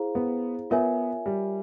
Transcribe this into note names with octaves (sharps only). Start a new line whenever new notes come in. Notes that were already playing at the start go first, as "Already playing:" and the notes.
Already playing: E4 G#4 C5 F5 A#5
B3
B3 F4 A#4 C#5 E5 G#5
G3